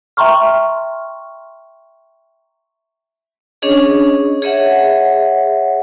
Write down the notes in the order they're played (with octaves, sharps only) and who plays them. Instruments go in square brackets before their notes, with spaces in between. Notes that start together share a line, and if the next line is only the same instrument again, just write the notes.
[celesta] E5 G5 A#5 C6 C#6 F6
[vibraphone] C#4 D4 G#4 C#5 D#5
G#4 C#5 D#5 E5 F#5